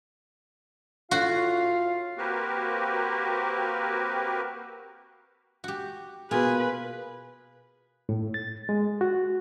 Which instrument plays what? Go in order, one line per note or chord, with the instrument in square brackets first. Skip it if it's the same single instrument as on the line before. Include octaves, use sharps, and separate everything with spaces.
[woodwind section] A2 F4 [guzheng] F#4 [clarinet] F5
[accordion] A#3 C4 F#4 G4 A#4 B4
[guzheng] F#4 G4
[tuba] B2 [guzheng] A#3 F4 [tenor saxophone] G#4 [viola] B4
[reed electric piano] A2
A6
G#3
F#4